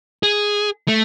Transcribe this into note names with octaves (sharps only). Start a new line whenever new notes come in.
G#4
A3